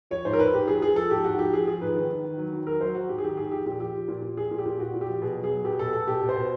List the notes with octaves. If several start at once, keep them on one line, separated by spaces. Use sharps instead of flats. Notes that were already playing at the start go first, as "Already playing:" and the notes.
F3 C#5
G#2 C5
A#4
G#2 B4
G#2 G4
F3 G#4
F3 G#4
F3 A4
G#2 G4
G#2 F#4
F3 G4
F3 G#4
F3 G#4
G#2 B4
D#3
D#3
D#3
F#3
D#3
F#3 A#4
F#3 C5
F#3 F#4
G#2 G4
G#4
D#3 G4
G#2 G#4
F3 G4
A#2 G4
F3 G4
F3
A#2
A#2
F3 G#4
A#2
G4
A#2
A#2 F#4
A#2
G4
F3
B2 G#4
F#3
G#4
F#3
B2 G4
B2 A4
B2 A4
B2 G4
B2
C5
B2